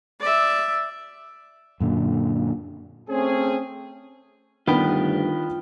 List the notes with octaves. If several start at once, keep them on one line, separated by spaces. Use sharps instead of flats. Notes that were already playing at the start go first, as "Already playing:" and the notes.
D5 E5
F#2 A#2 D3
A3 C4 C#4 G#4
D2 G2 D#3 B3 F4 B4 G5